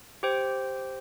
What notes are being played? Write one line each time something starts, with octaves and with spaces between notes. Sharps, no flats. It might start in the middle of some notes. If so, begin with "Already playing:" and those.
G4 C5 G5